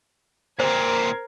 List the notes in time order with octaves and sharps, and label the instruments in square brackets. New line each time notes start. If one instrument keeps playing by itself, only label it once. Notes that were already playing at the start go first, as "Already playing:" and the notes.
[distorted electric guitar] A#2 C4 [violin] A#4 G#6 [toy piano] C5